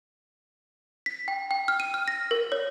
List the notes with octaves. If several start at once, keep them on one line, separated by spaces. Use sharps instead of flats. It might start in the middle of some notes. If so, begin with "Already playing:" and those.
B6
G5
G5
F6
D#7
F6
A#6
A#4
C#5